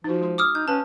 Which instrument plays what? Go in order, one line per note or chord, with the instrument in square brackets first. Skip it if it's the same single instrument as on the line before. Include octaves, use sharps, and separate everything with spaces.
[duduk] F3 [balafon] D#4 F#4
[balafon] G#3 C6
[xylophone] D6 D#6 F6
[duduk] D#4 [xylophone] G6
[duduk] C#4 [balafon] B4 F5 [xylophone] A5